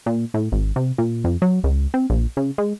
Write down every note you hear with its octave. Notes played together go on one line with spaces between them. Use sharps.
A#2
A2
G#1
C3
A#2
F2
F#3
C#2
C4
A#1
C#3
G#3